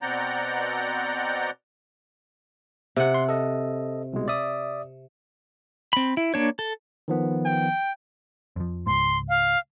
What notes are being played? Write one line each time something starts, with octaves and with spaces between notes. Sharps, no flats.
B2 C4 D5 F#5 A#5 G6
C3 F#5
C6
A4 D#5
C2 B2 G#3
D5 E5 D#6
C4 B5
E4
A#3 D4 C#5
A4
D#3 F3 B3
G5
F2 F3
C#2 G#2 C6
F5